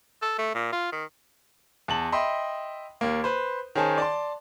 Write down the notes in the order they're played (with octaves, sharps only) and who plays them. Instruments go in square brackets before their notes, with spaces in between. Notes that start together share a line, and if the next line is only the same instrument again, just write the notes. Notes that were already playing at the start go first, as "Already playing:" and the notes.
[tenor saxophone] A4
A3
A#2
F4
D#3
[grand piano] E2 A5 F#7
D#5 E5 G5 B5 C6
D#2 A#3
B4 C5
D#3 C#4 G#4 C5 A5
D5 A5 C6